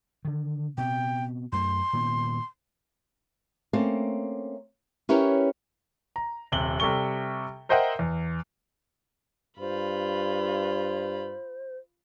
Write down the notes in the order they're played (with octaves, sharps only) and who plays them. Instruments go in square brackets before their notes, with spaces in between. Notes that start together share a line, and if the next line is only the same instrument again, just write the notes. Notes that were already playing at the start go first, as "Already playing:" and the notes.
[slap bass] D3 D#3
[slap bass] B2 C4 [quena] G5
[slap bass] F#2 A3 [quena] C6
[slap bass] A#2 D#3 B3
[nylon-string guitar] A3 A#3 C4 C#4
C#4 E4 G4 A#4 B4 C#5
[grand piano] A#5
D#1 C3 F#7 G7
C3 G3 A4 C#6 G7
A#4 C5 D#5 E5 F#5 G5
E2
[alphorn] G2 [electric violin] F4 B5 [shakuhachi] C5